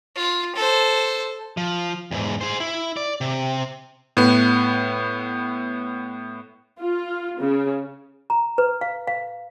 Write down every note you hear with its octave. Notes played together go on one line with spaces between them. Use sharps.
F4
A4 C5
F3
E2 G#2
G#4 C5
E4
D5
C3
A2 B3
F4
C#3
A#5
B4
F5
F5